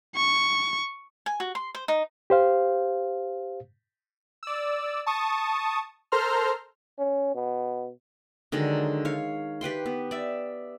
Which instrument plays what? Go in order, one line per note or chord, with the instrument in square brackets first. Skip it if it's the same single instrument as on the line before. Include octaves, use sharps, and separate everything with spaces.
[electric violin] C#6
[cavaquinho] G#5
F#4
C6
C5
D#4
[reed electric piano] G4 C5 F5
[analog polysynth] D5 E6
A5 C#6 D#6
A4 A#4 C5 A#5 C6 F6
[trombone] C#4
B2
[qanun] D3 D#3 F#3 G#3
C#5 F5
G4 B4 G5 C6
B3
D5 E5